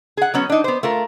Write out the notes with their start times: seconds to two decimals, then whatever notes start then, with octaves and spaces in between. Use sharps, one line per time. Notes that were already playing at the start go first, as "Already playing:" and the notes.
0.17 G#4 F#5
0.34 F#3 B3 C#4
0.50 D4 D#4
0.64 B3 C5
0.83 A3 F4 A#4